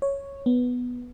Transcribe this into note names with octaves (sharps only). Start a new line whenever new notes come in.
C#5
B3